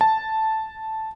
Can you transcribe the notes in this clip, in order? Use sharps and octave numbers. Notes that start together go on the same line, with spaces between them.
A5